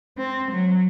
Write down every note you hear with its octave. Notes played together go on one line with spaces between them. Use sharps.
C4
F#3